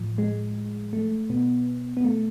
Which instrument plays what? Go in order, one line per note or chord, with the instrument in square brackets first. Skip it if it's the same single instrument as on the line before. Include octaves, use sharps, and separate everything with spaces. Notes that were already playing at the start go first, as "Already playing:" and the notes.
Already playing: [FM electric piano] A2 F3
G#3
A3
B2 B3
B3
A3